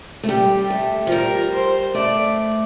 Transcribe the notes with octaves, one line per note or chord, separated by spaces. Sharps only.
A3
G3 G4
A3
F3
G3 A#4
C5
A3 D5